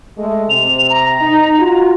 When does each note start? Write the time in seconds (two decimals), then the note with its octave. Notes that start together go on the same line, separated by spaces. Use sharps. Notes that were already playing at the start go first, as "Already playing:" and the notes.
0.17 G#3 A3
0.50 C3 F7
0.90 A#5
1.21 D#4
1.59 F4 F#4